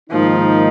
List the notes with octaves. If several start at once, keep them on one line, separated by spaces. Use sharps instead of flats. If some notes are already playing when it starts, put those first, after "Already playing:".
G#2 D#3 F3 A#3 D#4